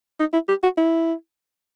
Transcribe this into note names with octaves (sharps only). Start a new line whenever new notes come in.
D#4
E4
G4
F#4
E4